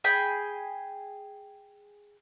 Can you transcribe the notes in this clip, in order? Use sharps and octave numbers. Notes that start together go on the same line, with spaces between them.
G#4 G5 B5